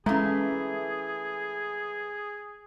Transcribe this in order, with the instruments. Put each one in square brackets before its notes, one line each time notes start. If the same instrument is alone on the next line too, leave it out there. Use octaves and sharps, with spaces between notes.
[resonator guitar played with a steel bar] E3 A3 [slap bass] G#3 [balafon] C#4 F5 A#5 [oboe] G#4